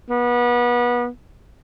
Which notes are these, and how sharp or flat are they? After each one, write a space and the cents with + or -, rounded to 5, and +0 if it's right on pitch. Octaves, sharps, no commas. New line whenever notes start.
B3 -30